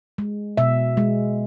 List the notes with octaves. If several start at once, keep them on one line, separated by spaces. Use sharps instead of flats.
G#3
B2 E5
G#3